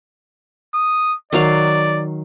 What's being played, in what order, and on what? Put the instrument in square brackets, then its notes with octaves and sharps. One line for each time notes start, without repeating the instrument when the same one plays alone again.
[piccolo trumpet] D#6
[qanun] D#3 F#3 F5 [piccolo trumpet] D5